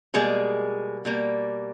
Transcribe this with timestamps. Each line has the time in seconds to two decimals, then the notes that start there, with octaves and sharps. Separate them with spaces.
0.14 B2 G3 G#3 A#3 G#4
1.05 B2 G3 A#3